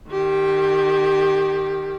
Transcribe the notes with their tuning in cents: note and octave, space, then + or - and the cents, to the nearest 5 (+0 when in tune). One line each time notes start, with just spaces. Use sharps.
D#3 -30 G4 +0